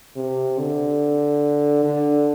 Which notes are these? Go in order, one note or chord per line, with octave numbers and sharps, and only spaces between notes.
C3
D3
D3